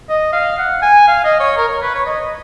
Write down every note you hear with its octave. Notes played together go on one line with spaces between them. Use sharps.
D#5
F5
F#5
G#5
F5
D#5
C#5
A#4
C#5
B4
C#5
D#5